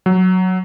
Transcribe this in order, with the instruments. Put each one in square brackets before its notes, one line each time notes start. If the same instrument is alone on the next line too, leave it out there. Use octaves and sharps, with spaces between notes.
[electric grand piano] F#3